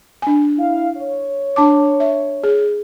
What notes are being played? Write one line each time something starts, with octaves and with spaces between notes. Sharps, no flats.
D4 G#5
E4 F5
C#5
D4 A5 D6
E5
G#4